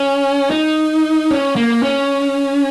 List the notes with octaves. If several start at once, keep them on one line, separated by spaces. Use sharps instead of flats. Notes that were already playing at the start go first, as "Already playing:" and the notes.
Already playing: C#4
D#4
C#4
A#3
C#4